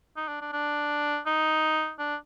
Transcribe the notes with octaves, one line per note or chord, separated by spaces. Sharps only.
D#4
D4
D4
D4
D#4
D4